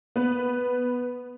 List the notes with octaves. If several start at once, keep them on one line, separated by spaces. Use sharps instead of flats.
B3 B4